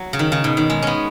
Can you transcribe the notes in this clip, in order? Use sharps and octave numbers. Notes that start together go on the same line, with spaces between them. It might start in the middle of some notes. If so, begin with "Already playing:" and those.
Already playing: F#3
C#3
D#3
C#3
B2
D#3
G#3
B3 C#4